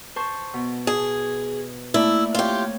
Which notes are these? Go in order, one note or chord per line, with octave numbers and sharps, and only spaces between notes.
C5 A5 C#6
B2
G#4
A3 A#3 E4 D5
C4 F4 G4 C#5